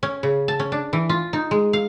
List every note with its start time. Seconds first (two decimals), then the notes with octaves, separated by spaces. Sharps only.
0.03 C#4
0.23 C#3
0.48 A5
0.60 C#4
0.72 D4
0.93 E3
1.09 F4
1.33 D#4
1.51 G#3
1.73 F5